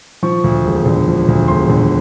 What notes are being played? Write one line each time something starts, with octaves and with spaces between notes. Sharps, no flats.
F3 C#6
D2
E1
D3
F3
D2
E1 C6
D3